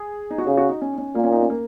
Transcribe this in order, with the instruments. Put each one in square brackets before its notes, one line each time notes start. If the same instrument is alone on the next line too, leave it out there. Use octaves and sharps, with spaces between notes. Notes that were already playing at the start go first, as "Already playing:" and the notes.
Already playing: [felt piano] G#4
D#4
F#4
[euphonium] C#3 [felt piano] G#4
[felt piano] F#4
D#4
C#4
D#4
C#4
[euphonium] A#2 [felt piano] A#3
[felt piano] C#4
D#4
C#4
A#3